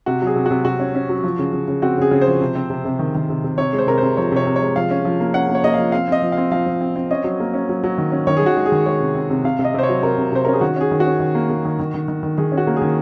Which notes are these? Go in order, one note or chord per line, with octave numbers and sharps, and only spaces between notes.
C3 F#4
F#3 G#4
C3
F#4
C3
C3 F#4
C#4
C#4
F#3
F3
C#3
C#3
C#3
C4 F#4
C#3 G#4
C#3
C5
F3
C3
C4
C3
C3
D#3
D#3
C3
C3
C3 C#5
G#3
C5
C3 A#4
C5
C3
F3 C#5
C3 C#5
C3
C#5
G#3
F3 F5
C#4
F3
A#3
C#4 F#5
A#3
C#5
A#3 D#5
F3 F5
C4 F5
C4 D#5
F3
F5
C4
F3 F5
F3
C4
C4
C#4 D#5
F#3
A#3
C#4
F#3
F#3
D#3
C#4
D#3 C#5
G#4
D#3 F#4
G#3
G#4
D#3
G#3 C#5
C3
C4
C3
C3 F5
C3
D#5
C3 C5
C#5
F#3
C3 A#4
C3
C3 C5
C#4 A#4
G#4
D#3 F#4
C#4 G#4
D#3
F#4
C#4
D#3
A#3
A#3
D#3
D#3
D#3
D#3
D#3
D#3 G#4
C#4
F#4
A#3
G#4
D#3